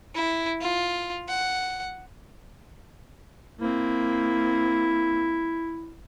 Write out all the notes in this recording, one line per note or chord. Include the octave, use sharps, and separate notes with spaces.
E4
F4
F#5
A#3 C4 E4